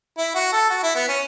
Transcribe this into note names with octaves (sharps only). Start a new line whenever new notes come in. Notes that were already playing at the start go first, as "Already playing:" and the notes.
E4
F#4
A4
F#4
E4
B3
C#4